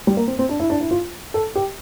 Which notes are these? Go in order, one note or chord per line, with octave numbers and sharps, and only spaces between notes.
G3
A#3
C4
C4
D4
E4
D4
E4
F4
A4
G4